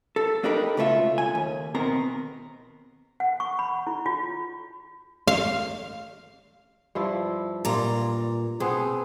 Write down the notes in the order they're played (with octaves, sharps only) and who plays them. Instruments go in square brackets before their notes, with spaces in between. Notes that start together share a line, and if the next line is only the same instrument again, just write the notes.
[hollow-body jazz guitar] A4
A#3 D4 D#4 G4 A#4 B4
C#2 B2 A3 F4 E5
G#5
D#2
B2 D#3 B3 C4 A#4 A#5
[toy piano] F#5
C#6
B5
E4
F4
[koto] F5
[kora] G2 F3 E4
[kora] G2 F4 [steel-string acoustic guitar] A#2 A#5
[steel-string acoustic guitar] B2 [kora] B3 C4 G#4